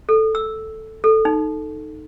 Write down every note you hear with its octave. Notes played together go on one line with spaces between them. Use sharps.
A4
E6
A4
D#4